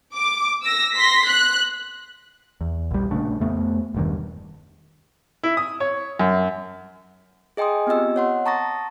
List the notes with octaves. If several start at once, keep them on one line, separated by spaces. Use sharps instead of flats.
D6
E6 A#6
C6 A#6 B6
F#6
E2
A#1 G3
A#1 C#3 A3 D4
F2 A3 B3
E1 G2 D#3
E4
D#6
C#5
F#2
G#4 D#5 G5 G#5 C6 D#6
B3 C4 F4 G4 D#5 E6
C#5 F#5 C6
A5 A#5 C#6 D#6 A6 A#6